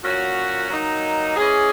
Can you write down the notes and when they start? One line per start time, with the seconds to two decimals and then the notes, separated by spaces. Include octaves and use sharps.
0.03 A#2 F#3 C#4 F#4
0.70 F#3 A#3 D#4
1.36 E3 G#3 C#4 G#4